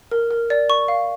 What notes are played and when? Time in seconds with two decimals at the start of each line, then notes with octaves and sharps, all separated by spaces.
0.11 A#4
0.31 A#4
0.50 D5
0.70 C#6
0.88 F5